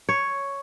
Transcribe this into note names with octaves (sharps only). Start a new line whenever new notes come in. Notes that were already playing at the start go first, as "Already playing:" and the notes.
C#5